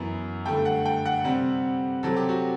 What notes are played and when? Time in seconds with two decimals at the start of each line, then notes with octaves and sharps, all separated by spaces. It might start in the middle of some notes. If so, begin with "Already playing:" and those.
Already playing: F#2 E3 B3
0.45 G2 D3 A3 G5
0.65 F#5
0.86 G5
1.06 F#5
1.24 C3 G3 C4
2.03 C3 F#3 C4 A4
2.16 G4
2.29 F#4